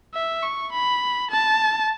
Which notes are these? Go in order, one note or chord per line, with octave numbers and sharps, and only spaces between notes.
E5
C#6
B5
A5